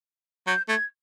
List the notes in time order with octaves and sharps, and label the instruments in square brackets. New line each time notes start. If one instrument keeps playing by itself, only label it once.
[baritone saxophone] F#3 [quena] G6
[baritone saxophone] A3 [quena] G#6